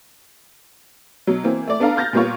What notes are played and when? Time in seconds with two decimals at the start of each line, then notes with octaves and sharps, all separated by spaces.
1.27 B2 F#3
1.44 E3 A#3 C4
1.67 A3 D5
1.80 B3 D4 A4 F5 A#5
1.97 F6 G6 A6 A#6
2.13 A#2 G3 A#3 B3 F4 C#5